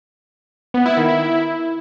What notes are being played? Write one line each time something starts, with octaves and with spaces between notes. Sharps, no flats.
B3
E4
D#3
E4